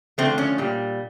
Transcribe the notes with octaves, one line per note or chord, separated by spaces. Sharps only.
D3 F3 A3 C4
C#4
A#2 G3